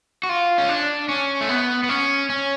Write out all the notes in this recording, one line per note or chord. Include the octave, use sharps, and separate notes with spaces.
F#4
F4
C#4
D4
C#4
A3
B3
B3
C#4
C#4